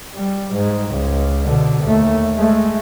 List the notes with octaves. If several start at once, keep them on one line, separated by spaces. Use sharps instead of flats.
G3
G#2
C#2
B2 D3
D#2 A3
G#3 A3